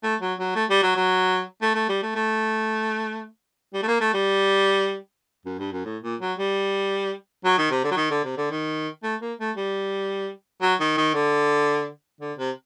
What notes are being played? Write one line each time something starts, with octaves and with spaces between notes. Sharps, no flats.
A3
F#3
F#3
A3
G3
F#3
F#3
A3
A3
G3
A3
A3
G3
A3
A#3
A3
G3
F#2
G2
F#2
A2
A#2
F#3
G3
F#3
D#3
C3
D3
F#3
D#3
D3
C3
D3
D#3
A3
A#3
A3
G3
F#3
D#3
D#3
D3
D3
C3